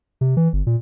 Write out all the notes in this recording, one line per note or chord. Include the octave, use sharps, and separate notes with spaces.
C3
E3
G1
A#2